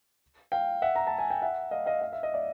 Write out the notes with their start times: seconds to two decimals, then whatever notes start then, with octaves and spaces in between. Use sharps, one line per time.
0.52 F5 G5
0.82 E5 F#5
0.96 A#5
1.07 A5
1.18 G#5
1.30 G5
1.42 E5 F#5
1.71 D#5 F5
1.86 D#5 F5
2.01 F5
2.13 E5
2.23 D#5
2.34 D5 E5